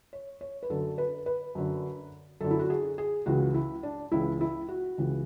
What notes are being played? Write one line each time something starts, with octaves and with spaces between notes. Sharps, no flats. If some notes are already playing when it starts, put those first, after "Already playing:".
C#5
C#5
B4
F#2 D3 A4
B4
B4
F#2 D3
F#2 D3 A4
E4
F#4
G#4
G#4
C#2 C#3 E3 F#4
E4
D4
C#2 C#3 E3 E4
E4
F#4
C#2 C#3 E3